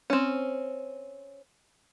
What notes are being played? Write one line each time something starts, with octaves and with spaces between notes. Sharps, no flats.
C4 C#4